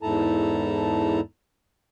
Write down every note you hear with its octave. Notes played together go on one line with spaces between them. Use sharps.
E2 G#2 E4 A4 A5 A#5